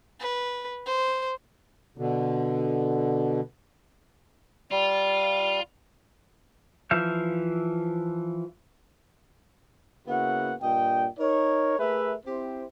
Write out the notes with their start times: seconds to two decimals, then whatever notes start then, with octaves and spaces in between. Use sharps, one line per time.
0.20 B4
0.86 C5
1.98 B2 D3
4.71 G3 F4
6.91 E3 F3 E5 F5 G6
10.07 C#3 A#3 B3 E4 F#4 F#5
10.62 G2 A#2 D#5 G5
11.19 D#4 A#4 C#5
11.78 A3 G#4 A#4 B4 E5
12.26 C4 E4 G4 C5